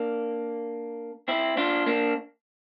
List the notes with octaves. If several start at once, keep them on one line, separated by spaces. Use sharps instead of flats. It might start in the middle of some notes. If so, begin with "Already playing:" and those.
Already playing: A#3 D4
C4 E4
D4 F4
A#3 D4